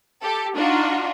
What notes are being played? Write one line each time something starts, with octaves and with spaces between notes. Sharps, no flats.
G4 A4
D4 D#4 F4 F#4